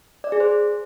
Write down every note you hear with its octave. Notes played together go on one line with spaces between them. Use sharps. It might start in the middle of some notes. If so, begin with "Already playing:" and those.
D5
G#4
C5